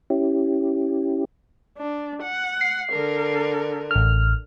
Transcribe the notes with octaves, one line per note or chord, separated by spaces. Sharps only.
C#4 E4 G4
D4
F#5
C7
D3 A#4
A1 F6